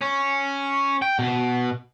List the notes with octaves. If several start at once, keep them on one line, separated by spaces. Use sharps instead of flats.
C#4
G5
B2